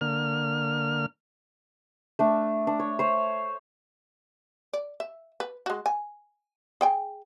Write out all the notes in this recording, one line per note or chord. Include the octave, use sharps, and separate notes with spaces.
D3 A#3 F6
A3 D4
D4
C#5
C5 C#5
D5
E5
B4
G#3 F#4
G#5
G#4 G5 G#5